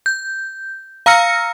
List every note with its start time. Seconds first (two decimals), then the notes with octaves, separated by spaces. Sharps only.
0.06 G6
1.06 F5 A#5 E6 F6 A#6 C#7